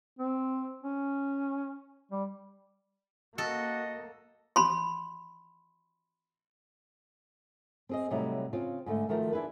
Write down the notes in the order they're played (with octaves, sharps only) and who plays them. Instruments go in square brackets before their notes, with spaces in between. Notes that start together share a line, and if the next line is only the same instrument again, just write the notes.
[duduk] C4
C#4
G3
[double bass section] A#3 [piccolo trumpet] F#4 [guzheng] A4 [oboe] D#5
[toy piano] B5 C6
[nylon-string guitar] C4 G#4 D#5
A2 C3 F#3 G3 D#4
C#3 C4 F4
G#2 D3 A3
D#3 F3 A3 F#4 A#4 C5
D4 E4 G#4 B4